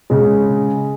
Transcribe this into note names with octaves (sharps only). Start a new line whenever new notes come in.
C#3 G#3